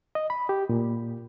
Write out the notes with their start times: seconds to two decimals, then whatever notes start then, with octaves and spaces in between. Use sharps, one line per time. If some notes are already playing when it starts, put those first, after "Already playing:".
0.15 D#5
0.30 B5
0.49 G4
0.69 A#2